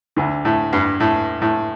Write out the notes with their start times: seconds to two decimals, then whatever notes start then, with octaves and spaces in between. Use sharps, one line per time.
0.16 D2 D3
0.45 A2
0.73 G2
1.00 A2
1.42 A2